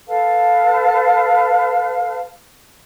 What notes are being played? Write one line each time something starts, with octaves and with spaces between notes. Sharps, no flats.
A4 B4 F5 A5